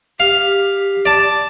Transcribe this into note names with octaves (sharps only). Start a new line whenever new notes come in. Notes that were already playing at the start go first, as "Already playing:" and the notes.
G4 F5
D5 A5